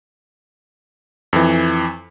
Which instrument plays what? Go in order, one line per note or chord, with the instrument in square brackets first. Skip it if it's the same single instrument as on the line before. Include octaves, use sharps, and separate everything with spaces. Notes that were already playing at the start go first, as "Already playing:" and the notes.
[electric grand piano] F2 E3